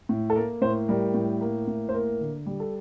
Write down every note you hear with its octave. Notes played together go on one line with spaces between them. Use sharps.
A2
A4
A#3 A#4
A2 C5
G3 A#4
A2
A#3
A2
C5
A#3 A#4
D3
G3
A4